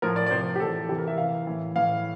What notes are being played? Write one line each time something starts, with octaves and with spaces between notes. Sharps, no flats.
A2 F3 A#4
D5
D5
C3 F3 C5
G4
A2 E3 A4
C3 E3 G4
A#4
E5
C3 E3 F5
A2 E3
A2 E3 F5